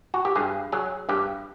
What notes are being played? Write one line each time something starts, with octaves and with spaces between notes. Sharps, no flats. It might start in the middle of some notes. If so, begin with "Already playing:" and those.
F#4
G4
G2 G#4
F#3 G#4
G2 G4